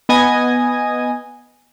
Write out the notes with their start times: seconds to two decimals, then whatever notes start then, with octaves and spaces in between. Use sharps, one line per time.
0.09 B3 D#5 G#5